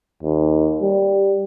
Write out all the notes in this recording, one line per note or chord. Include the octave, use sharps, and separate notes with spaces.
D#2
G3